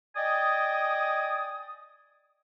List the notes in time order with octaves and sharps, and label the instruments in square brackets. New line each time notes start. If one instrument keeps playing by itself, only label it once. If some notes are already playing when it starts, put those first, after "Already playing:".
[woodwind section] D5 D#5 G5 G#5 D#6